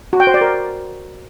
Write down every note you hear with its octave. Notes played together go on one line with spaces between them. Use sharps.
F#4
G5
C5
D5
A#4